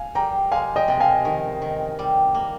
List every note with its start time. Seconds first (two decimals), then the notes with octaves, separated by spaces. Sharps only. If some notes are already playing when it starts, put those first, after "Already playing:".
Already playing: F5 G#5
0.15 G3 G5 A#5
0.52 G#3 F5 G#5
0.76 D#5 G5
0.88 C3 G5
1.00 F5 G#5
1.25 D#3
1.62 D#3
1.99 G3
2.34 A#3